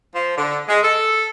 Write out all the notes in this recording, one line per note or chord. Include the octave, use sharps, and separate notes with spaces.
F3
D3
G#3
A4